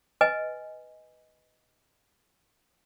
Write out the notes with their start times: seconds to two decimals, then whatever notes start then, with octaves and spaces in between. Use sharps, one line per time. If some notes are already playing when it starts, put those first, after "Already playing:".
0.21 B4 D#5 G#5